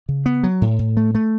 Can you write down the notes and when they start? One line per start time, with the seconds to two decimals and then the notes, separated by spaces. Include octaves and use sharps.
0.09 C#3
0.26 B3
0.43 F#3
0.61 A2
0.79 A2
0.97 A3
1.15 A3